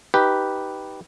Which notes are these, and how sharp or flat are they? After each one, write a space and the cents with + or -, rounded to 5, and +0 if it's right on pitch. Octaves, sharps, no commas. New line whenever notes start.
D#4 +10 G4 -10 B4 +0